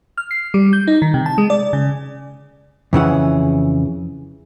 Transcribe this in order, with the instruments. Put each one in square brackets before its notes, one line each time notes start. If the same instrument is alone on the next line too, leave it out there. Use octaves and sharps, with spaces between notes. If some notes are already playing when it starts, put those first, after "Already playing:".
[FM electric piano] F6
C7
G3
G6
D#4
D#3
C3
A5
G#3
D5
C#3
[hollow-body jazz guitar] F2 C#3 E3 F#5